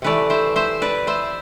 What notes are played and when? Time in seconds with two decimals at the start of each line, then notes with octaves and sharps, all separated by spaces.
0.02 C3 E3 A3 B4 D5
0.30 C5 E5
0.56 C5 E5
0.82 B4 D5
1.07 C5 E5